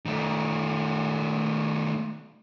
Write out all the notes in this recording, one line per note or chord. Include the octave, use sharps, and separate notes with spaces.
D#3 A3